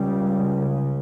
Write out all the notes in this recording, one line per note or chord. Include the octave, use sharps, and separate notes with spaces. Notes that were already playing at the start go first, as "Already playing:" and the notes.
Already playing: C#2 C#3 G3